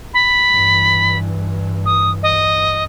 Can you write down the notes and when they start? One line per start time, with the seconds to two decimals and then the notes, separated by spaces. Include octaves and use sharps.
0.14 B5
0.51 G2 E3
1.86 D#6
2.23 D#5